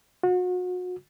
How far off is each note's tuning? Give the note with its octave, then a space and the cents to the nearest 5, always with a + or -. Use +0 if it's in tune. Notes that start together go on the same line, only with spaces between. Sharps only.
F#4 -35